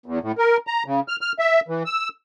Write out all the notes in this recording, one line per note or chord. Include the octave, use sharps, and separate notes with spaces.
E2
A2
A#4
A#5
C#3
F6
F6
E5
E3
E6